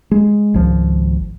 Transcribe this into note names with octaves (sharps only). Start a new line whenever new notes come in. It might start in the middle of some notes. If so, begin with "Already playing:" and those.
G#3
G#1 C#2 F3